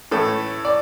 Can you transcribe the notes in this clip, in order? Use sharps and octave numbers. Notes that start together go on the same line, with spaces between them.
A2 E3 A3 C#4 A4
D5